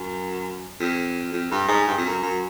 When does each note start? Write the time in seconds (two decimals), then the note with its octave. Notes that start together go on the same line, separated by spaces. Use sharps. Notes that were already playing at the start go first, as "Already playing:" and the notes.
Already playing: F#2
0.80 F2
1.33 F2
1.51 G2
1.68 G#2
1.87 G2
1.97 F2
2.05 F#2
2.23 F#2